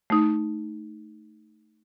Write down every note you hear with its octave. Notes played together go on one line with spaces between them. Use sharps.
A3 D#4